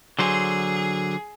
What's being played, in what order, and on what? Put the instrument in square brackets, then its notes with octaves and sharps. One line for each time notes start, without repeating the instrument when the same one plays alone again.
[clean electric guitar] D3 F#3 C5 [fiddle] G#4